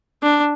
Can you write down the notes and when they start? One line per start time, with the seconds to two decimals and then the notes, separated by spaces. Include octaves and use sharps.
0.23 D4